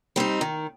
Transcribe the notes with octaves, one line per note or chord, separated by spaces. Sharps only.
G3 C4 D#4
D#3